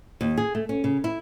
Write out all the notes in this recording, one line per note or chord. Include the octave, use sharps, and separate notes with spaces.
D#2
G#4
A3
C#4
C#3
E4